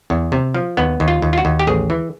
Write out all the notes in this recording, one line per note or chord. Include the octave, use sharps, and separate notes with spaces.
E2
C3
F3
D#2 B3
D#2
F4
D#2
F4
F#4
D#2
G4
A1 G#4
E3